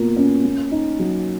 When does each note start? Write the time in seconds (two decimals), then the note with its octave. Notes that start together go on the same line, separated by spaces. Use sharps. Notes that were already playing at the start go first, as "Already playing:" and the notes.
Already playing: B2 A#3 F4
0.16 C#4
0.45 A#3
0.72 D#4
0.99 F#3